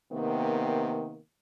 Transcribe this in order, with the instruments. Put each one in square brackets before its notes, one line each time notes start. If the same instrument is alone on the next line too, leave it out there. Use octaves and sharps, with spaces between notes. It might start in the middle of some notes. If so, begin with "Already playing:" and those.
[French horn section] C3 D#3 A#3 B3